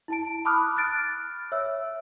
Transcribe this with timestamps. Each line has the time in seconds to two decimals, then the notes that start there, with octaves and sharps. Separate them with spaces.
0.08 E4 A5 D7
0.45 A5 B5 D6 D#6 F6 F#6
0.77 F6 F#6 A6 D7
1.52 C#5 E5 E6